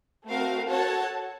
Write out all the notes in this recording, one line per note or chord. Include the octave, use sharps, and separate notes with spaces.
A3 C4 F#4 A#4 F5
F#4 A4 C#5 F#5 A5